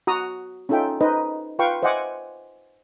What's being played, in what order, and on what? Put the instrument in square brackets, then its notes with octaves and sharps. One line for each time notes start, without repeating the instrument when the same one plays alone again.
[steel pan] F#4 A#5 D#6
C#4 D#4 F4 A4 E5 G5
D#4 B4 C5 D#5
F4 B4 F5 G5 C#6
C5 D#5 E5 F#5 G#5 D6